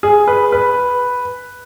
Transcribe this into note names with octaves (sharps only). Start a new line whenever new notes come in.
G#4
B4
B4